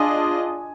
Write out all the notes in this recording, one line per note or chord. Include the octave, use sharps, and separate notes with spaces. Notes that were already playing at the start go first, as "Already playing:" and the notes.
Already playing: D4 F4 G#4 D#5 G#5